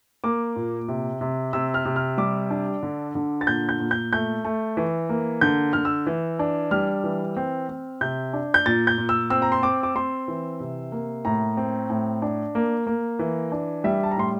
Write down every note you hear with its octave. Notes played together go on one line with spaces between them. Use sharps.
A#3 D6
A#2
C3
C3
C3 E6
F6
C3
F6
G3 D6
D4
D3
D3
A6
A#2 G6
G6
A#2
G6
A3 G6
A3
E3
A#3
D3 G6
D3 F6
E6
E3
D4
G3 F6
E3
C4
C4
C3 G6
D4
G6
A#2 A6
G6
A#2
E6
C4 E6
A#5
C6
C4 D6
D6
C4 C6
E3
C3
A#3
A2 A#5
C4
A2
D4
A#3
A#3
E3
D4
G3 E5
A5
A#5
A2 C6